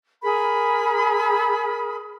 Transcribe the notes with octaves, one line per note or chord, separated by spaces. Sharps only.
G#4 A#4 B5